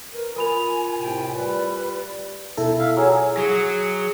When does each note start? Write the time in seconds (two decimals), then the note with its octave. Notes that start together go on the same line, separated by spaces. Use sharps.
0.13 A#4 B4
0.36 F4 A#4 G#5 B5 F7
0.97 A2 C3 G5
1.34 G3 B4
2.57 B2 E4 A4
2.79 E5 F5
2.97 F#3 G#4
3.37 F#3 G#4